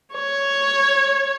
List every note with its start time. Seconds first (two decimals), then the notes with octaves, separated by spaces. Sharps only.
0.14 C#5